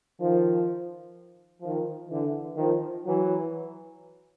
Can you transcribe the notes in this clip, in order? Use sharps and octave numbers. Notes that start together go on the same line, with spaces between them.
D#3 F3
D#3 F3
D3 E3
D#3 F3
E3 F#3